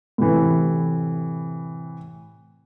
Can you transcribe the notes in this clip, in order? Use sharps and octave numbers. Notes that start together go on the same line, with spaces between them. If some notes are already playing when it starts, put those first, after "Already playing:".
A2 C3 E3